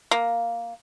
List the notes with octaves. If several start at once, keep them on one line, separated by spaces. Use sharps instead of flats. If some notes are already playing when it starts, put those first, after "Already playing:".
A#3